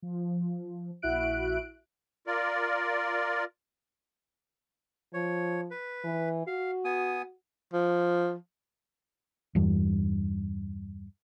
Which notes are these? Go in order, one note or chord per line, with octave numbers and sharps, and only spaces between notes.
F3
A#1 E4 F#4 E5 F#6 D7
F4 A#4 D5
F3 C#5
B4
E3
F#4 F5
B3 G#5 D#6
F3
E2 G2